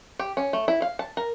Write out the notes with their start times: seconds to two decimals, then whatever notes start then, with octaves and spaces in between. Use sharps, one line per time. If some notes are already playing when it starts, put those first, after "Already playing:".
0.19 G4
0.37 C#4
0.53 A3
0.68 E4
0.82 F5
0.99 A5
1.17 A#4